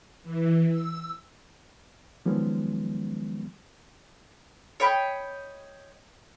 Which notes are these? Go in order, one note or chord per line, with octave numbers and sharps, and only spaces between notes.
E3
E6
D#3 F3 F#3 G#3 B3 C#4
C#5 D#5 G5 B5